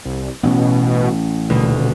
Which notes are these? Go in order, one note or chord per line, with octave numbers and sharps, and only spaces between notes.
C2
A1 B2 C4 C#4
D#1 D2 B2